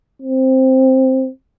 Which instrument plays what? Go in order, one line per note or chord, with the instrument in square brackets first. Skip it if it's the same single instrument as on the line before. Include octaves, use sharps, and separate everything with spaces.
[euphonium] C4